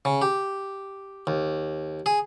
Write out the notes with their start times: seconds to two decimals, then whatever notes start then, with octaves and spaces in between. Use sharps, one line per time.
0.05 C#3
0.22 G4
1.27 D#2
2.06 G#4